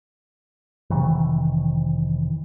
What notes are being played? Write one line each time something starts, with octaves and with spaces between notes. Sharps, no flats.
F1 C3 D#3 E3